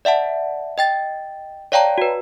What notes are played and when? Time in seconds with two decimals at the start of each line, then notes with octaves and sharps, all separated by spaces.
0.05 D5 E5 F#5 A5
0.78 D#5 G5 A6
1.72 C#5 D5 F5 G5 A5 A#5
1.98 F#4 B4